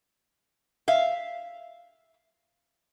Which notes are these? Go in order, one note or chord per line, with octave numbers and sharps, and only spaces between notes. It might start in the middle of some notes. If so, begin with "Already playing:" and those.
E5 F5